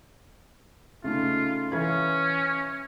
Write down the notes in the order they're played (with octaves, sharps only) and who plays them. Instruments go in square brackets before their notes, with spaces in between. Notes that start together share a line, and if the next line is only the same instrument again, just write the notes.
[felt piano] C#3 A3 D#4 [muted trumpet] F4
[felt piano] E3 F5 G#6 [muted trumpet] C#4